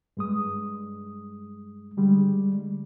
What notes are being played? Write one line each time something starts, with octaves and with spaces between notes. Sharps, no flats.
G2 G#3 D#6
D3 G3 G#3